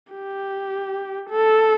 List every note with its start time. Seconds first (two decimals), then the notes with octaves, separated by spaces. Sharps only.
0.13 G4
1.30 A4